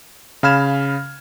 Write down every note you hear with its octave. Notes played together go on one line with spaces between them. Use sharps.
C#3 F5 B5 F6 G#6 E7